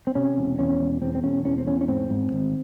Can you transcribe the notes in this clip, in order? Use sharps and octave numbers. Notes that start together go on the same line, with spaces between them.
C4
C3 C#4
E1
E2 C#4
E1
E2 C4
C4
E1 C#4
E2 C#4
C4
E2 C#4
C#4
G#2 C4
G#2
G#1